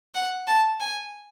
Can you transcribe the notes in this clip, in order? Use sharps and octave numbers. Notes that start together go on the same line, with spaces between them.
F#5
A5
G#5